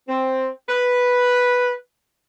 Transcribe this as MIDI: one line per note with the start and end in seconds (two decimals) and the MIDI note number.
0.09 0.49 60
0.69 1.71 71